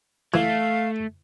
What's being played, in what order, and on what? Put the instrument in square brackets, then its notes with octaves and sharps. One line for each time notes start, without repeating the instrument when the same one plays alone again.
[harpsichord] E3 [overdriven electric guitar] A3 [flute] F5